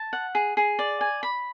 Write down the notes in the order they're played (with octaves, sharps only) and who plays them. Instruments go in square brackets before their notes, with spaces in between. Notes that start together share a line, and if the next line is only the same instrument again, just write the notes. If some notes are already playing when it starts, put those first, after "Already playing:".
Already playing: [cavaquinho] A5
F#5
G#4
G#4
D5
G#5
B5